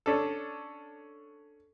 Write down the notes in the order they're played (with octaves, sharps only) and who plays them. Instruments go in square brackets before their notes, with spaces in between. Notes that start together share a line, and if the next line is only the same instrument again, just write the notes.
[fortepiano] C#4 D4 A4